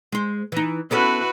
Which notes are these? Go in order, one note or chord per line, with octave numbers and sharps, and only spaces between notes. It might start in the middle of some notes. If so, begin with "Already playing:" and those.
G#3 C5
E3 D#4
B3 C#4 E4 F#4 A4 B4